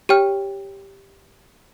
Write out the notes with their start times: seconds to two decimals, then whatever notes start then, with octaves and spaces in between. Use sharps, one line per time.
0.09 G4 C#5 G5 F6